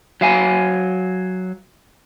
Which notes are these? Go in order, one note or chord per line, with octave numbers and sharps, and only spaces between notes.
F#3 F5 G#5